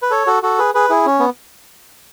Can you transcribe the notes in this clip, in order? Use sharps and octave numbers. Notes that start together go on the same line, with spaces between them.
B4
A4 C#5
F#4 A4
F#4 A4
G#4 B4
G#4 B4
E4 G#4
C#4
B3